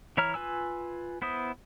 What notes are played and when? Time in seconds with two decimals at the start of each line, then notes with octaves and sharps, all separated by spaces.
0.17 E3 E4 C#5 A#5 F6
0.34 F4 B4 G#5 E6
1.22 B3 E4 C5 D#6